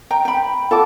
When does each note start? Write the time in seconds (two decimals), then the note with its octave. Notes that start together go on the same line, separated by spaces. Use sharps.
0.11 G5 A#5
0.25 G5 B5
0.71 A4 F#5 A5 D6